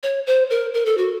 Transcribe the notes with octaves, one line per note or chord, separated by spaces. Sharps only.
C#5
C5
A#4
A#4
A4
F#4